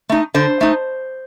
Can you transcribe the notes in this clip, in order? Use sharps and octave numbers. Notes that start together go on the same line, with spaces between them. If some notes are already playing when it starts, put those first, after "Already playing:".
A3 D#4
D3 C5
A3 D#4